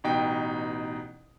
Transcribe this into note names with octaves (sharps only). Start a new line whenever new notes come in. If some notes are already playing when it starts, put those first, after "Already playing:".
A1 B2 D#4 G5